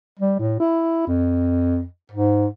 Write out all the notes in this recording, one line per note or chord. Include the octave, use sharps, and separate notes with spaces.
G3
A2
E4
F2
G#2